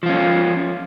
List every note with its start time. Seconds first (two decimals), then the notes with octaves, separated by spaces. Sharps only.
0.03 F3
0.06 F4
0.09 C#4